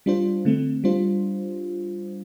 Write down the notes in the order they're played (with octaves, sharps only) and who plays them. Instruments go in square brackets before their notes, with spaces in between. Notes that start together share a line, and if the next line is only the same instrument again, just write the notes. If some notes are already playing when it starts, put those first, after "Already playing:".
[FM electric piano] G3 D4 F4 C5
D3 A3 C4
G3 D4 F4 C5